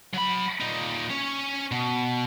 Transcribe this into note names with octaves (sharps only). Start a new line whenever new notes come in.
F#3 B5
A#2 D#4
C#4 C#5
B2